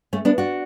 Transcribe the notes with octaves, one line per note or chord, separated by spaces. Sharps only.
A3 C#4
B3 D4
D4 F#4